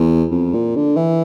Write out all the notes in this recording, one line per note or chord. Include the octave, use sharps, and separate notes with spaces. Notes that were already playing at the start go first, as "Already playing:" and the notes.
Already playing: E2
F2
A#2
D3
E3